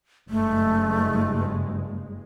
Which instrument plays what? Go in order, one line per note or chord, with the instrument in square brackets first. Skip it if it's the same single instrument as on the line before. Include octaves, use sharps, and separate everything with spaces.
[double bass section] F#1 G2 G#3 [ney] A3